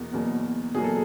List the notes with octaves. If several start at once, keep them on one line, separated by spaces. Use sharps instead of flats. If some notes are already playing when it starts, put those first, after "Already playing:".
Already playing: E2 B2 A#3
E2 B2 F#3 A#3
E2 B2 F#3 A#3 G#4
A4